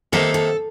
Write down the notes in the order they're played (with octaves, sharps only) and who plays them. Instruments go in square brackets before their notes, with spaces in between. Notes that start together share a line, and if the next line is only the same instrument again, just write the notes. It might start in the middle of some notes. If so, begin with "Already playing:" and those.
[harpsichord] C3 D#3 A#3 D#4 [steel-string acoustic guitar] A4
[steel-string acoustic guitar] A4